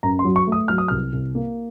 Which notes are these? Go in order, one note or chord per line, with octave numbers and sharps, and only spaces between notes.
F#2 A#5
C6
F#3
C#6
A3 D#6
F#3 F6
D#6
C2 F6
C2
A#3